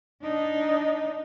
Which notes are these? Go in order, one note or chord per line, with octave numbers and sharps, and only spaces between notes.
D4 D#4